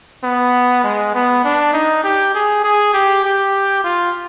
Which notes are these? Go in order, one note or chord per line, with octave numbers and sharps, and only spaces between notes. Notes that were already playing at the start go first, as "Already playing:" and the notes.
B3
G#3
B3
D4
D#4
G4
G#4
G#4
G4
G4
F4